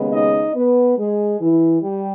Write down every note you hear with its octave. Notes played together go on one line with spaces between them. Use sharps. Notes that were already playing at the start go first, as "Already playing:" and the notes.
Already playing: D#2 C#3 G#3 B3
D#4 D#5
B3 B4
G#3 G#4
E3 E4
G3 G4